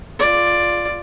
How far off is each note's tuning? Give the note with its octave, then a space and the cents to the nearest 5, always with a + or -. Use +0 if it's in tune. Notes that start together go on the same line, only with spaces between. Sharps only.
F4 +0 D5 +5